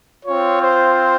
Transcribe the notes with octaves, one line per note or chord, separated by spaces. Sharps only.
C4 F4 C#5
C5